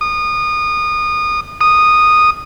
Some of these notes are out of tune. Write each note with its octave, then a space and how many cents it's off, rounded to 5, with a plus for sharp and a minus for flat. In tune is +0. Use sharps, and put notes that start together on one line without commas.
D#6 -25
D#6 -10